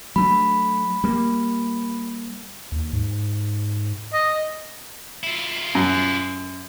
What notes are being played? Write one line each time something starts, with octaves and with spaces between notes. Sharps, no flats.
F#3 A3 D4 B5
G3 A#3
D#2
G#2
D#5
E4 F4
F#2